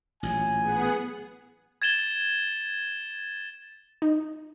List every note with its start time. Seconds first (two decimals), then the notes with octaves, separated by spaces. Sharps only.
0.23 A1 A#2 F#3 G#5
0.61 B3 G#4 F#5
1.82 G#6 A6 E7 G7
4.02 D#4